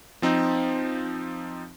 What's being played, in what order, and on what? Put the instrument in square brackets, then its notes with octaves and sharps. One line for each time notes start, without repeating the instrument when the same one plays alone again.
[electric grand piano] F3 C4 D#4